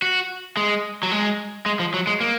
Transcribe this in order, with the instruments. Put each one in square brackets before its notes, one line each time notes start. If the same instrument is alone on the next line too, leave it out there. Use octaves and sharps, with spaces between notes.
[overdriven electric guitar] F#4
G#3
F#3
G#3
G#3
F3
F#3
G#3
A#3